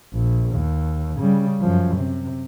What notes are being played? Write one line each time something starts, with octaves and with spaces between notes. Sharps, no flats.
A#1
D#2
C#3 G3
F#2 F3
C3